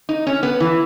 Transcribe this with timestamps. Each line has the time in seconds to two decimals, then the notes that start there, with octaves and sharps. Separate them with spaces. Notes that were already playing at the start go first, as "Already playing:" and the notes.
0.09 D#4
0.27 C#4
0.43 B3
0.60 E3